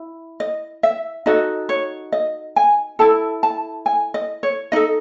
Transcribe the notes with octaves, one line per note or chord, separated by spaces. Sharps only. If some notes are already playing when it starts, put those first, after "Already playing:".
Already playing: E4
D#5
E5
D#4 F#4 A4 D#5
C#5
D#5
G#5
E4 A4 A5
A5
G#5
D#5
C#5
D#4 A4 D#5